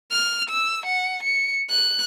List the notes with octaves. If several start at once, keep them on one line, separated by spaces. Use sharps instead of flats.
F6
E6
F#5
C#7
F#6